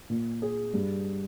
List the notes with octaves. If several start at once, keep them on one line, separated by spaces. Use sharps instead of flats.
A#2
G#4
G2